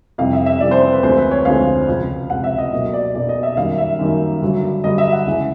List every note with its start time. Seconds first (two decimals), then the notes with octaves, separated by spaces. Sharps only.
0.18 F2 C3 E3 G3 F5
0.33 E5
0.46 E5
0.60 F2 C3 E3 G3 D5
0.71 C5
0.82 C5
0.93 B4
1.03 D2 D3 F3 G#3 C4 C5
1.18 B4
1.31 C#5
1.45 D2 D3 F3 G#3 C4 F5
1.88 C#2 C3 F3
2.30 C#2 C3 F3 F#5
2.44 E5
2.58 D#5
2.72 B1 B2 F#3 A#3 D#5
2.93 D5
3.15 B1 B2 F#3 A#3 D5
3.29 D#5
3.43 E5
3.57 F#2 D#3 G3 A#3 F5
3.78 E5
3.99 F#2 D#3 G3 A#3
4.42 G2 D3 F#3
4.84 G2 D3 F#3 D#5
4.98 E5
5.12 F#5
5.26 C#2 C#3 E3 G#3